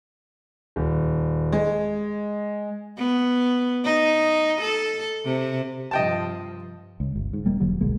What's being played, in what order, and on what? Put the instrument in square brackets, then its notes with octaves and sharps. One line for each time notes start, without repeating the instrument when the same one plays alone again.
[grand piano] D#1
G#3
[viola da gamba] B3
D#4
A4
C3
[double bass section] G2 C3 F3 [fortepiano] D#5 G5 A5
[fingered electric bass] C#2
G1
G#2
E1 G3 A#3
E1 D3 F#3 G3
D#1 B1 G#3 A#3